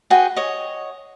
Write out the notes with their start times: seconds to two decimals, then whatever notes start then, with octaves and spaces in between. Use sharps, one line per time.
0.10 F#4 G#4 B4 G5
0.36 C#5 D#5